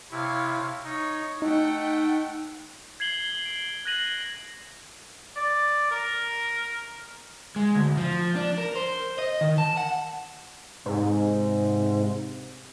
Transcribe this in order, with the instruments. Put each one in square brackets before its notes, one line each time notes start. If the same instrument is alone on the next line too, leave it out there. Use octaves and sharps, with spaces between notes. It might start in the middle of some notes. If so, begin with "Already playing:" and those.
[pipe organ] C3 E4 [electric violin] C#5 F5
[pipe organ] D#4 [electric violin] C#5
[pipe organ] A3 [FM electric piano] D#4 [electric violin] F#5 G5
[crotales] G#6 C7 F#7 G7
D7
F#6 G#6 A#6 D#7 F#7
[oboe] D5
A#4
[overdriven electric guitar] G#3
D2
F3
D4
A#4
C5
D#5
D#3
A5
F#5
[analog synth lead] G#2 [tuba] C3